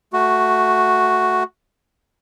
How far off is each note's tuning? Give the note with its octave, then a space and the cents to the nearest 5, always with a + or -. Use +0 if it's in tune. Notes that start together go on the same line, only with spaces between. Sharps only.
A3 +0 F#4 +0